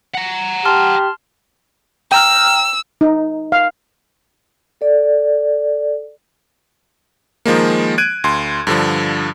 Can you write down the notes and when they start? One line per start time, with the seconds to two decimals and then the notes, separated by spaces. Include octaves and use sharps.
0.15 F#5 A#5
0.65 G4 A5 C6 F6
2.12 G5 A#5 E6 F6
3.01 D#4
3.52 F5
4.81 A4 D5
7.46 D#3 F3 G#3 A#3
7.98 F#6 G#6 D7 D#7
8.24 D2 C6
8.67 G2 D3 F3